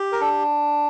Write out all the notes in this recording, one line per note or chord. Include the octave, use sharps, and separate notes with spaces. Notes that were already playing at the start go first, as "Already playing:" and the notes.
Already playing: G4
A#4
D4 A4